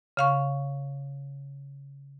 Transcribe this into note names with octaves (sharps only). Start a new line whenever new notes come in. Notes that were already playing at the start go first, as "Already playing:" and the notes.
C#3 F5 C#6